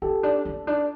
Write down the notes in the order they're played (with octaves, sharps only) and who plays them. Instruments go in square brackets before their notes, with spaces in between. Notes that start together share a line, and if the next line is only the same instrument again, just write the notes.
[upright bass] C#4 [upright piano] G4 A4
[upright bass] D4
C#4
D4